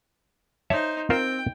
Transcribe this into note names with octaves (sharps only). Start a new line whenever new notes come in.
D#4 C5 C#5 E5 A5
C4 F4 A#4 C5 G5